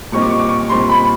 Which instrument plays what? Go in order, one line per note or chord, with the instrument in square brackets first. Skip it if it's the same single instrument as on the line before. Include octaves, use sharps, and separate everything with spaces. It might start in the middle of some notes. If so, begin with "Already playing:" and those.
[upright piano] A#2 G3 C4 D#4 [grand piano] C#6
[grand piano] D6
C#6
D6
C#6
[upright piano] A#2 G3 C4 D#4 [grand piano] C6
[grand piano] B5